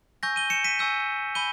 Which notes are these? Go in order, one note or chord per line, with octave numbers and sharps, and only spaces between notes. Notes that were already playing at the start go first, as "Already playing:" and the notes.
G#5 C#6 E6 G6 A#6
D#7 G7
C#7 E7
B6 D#7
G#5 C#6 E6 G6
G#5 B5 G6 D#7 G7